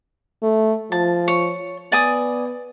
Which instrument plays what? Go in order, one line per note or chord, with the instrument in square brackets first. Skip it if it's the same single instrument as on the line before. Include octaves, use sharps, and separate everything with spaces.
[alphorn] A3
[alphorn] F3 [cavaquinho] A5
[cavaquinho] C#5
[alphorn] B3 [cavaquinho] D5 G#5 D#6